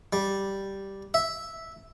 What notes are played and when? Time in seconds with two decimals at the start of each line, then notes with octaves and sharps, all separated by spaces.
0.13 G3
1.14 E5